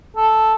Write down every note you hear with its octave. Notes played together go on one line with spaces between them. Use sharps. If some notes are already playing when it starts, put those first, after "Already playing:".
A4